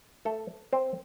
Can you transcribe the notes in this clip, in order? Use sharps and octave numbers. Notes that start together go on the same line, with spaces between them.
A3 A4
C4 C5